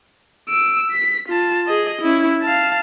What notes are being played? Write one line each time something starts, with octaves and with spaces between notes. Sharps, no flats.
E6 D7
B6
F4 A5
G#4 D#5
C#4 E4
F5 A5